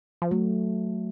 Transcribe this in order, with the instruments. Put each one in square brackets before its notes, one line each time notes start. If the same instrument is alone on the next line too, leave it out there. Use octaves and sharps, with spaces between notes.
[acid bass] F3
[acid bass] F#3 [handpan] A3